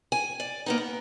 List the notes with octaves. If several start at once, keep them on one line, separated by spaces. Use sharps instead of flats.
G#5
D5
A#3 B3 D#4
B3